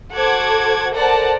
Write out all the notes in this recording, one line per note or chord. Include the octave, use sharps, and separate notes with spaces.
F#4 A4 C5 F#5 D6 G#6
A4 A#4 C5 D5 F#5 A5